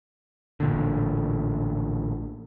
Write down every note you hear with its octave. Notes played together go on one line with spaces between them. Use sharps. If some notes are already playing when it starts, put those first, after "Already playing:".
A1 A#2 D3